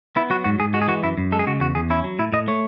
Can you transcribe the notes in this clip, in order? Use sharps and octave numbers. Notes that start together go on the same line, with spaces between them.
B3 E4
F#3 F#4
G#2 F#4
G#2 G#4
G#3 F#4
G#4
E3 F#4
F#2 E4
F#2
G#3 A4
G#4
C#3 F#4
E2 F#4
E2 G#4
C#4 E4
F#3
A2 E4
A2 D#5
A3 C#5